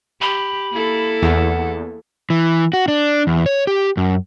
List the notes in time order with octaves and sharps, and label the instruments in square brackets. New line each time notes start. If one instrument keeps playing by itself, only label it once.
[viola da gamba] G4 [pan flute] B5
[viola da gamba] A#3 E4 A4
[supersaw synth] E2 [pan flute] F#5
[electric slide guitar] E3
F#4
D4
E2
C#5
G4
F#2